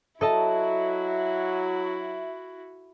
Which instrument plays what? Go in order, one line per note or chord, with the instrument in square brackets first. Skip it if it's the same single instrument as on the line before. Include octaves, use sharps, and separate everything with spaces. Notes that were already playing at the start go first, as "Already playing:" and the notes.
[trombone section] F#3 [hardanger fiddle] E4 F#4 [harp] A4 D#5 A5 [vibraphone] E5